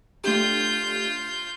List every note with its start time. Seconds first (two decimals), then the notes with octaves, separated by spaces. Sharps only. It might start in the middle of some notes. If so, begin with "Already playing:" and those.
0.24 A3 D4 F4 G4 G6